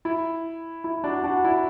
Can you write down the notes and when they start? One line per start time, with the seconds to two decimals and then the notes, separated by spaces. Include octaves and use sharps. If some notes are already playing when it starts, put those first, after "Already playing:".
0.05 E4
0.84 E4
1.04 D4 F#4
1.24 D4 F#4
1.44 E4